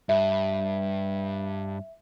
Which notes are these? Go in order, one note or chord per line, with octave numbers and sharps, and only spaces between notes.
G2 E5